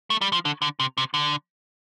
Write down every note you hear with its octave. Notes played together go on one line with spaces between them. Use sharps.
A3
G3
F3
D3
D3
C3
C3
D3